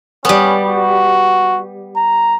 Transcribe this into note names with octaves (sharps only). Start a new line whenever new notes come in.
G3 B3 C#4
F#4
A#5